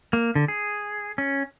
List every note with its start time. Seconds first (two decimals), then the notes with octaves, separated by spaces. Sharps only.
0.13 A#3
0.35 D3
0.48 G#4
1.18 C#4